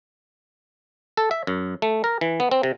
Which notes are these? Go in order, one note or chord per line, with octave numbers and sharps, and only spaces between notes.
A4
E5
F#2
A3
A#4
E3
B3
C4
C3